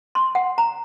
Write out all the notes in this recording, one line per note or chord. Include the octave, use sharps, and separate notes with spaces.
C6
F#5
A#5